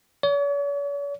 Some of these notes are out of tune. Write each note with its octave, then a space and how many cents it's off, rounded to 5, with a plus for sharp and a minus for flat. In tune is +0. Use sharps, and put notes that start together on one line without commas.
C#5 +45